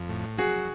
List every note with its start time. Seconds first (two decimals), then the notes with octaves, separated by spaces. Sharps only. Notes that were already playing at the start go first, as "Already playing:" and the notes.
Already playing: F2
0.09 A2
0.38 F#3 F#4 G#4